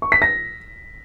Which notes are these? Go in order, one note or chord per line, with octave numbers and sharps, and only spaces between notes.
C#6
B6
A#6